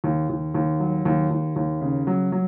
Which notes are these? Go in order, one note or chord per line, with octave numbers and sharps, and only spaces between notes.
D#2
D#2
D#2
F#3
D#2
D#2
D#2
C#3
F#3
F#3